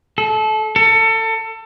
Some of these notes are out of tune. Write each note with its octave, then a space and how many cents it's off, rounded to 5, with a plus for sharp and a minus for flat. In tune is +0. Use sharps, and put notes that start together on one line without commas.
A4 -25
A4 +25